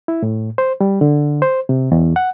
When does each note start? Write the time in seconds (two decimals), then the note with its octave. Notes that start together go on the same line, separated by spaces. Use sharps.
0.08 E4
0.23 A2
0.58 C5
0.81 G3
1.01 D3
1.42 C5
1.69 C3
1.92 E2
2.16 F#5